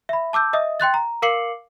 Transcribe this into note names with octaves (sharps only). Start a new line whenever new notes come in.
E5 B5
A5 D6 E6 G6
D#5 E5 D#6
G5 C6 F#6 A6
A#5
A#4 F5 D6 C7 C#7 F#7